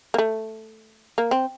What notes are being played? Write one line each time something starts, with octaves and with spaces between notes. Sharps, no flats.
A#3
A3
A#3
C4